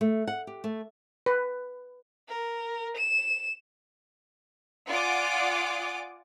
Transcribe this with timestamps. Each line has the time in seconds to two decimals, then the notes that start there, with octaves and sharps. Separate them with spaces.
0.01 A3
0.27 F#5
0.47 G4
0.64 A3
1.26 B4
2.29 A#4
2.97 E7
4.88 F4 D5 F#5 G#5 D6 D#6